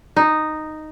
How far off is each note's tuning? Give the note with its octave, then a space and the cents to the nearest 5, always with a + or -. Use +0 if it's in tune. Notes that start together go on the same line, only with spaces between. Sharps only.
D#4 -5